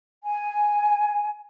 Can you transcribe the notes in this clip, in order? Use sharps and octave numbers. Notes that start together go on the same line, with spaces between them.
G#5